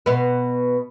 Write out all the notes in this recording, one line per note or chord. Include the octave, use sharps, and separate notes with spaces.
B2 B3